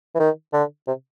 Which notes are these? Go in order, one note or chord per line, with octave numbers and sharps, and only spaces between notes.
E3
D#3
D3
C3